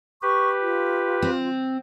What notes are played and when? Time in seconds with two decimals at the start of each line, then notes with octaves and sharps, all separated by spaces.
0.22 G4 B4 C#6
0.61 F4
1.22 C4